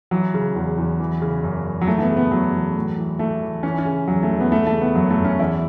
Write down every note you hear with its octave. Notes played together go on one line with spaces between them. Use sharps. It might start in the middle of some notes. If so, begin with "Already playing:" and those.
E3 F#3
C#3
E2
E2
E3
C#3
F#2
F#2
F#3
E3 A3
A3
B3
C#3
B3
E2 F#3
E2
A2
E3
A2 A3
E3
E3 C#4
C#4
C#3
E2 F#3
A3
E2
B3
E3 A3
A3
C#3
B3
F#2 F#3
A3
F#2
C#4
E2 E4